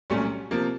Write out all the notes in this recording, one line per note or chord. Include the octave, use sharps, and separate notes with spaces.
C2 A#2 F#3 A3 C#4
C3 F3 A#3